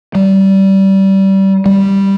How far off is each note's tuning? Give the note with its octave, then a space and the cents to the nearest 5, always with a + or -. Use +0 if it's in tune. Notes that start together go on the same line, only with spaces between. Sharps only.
G3 -20
G3 +0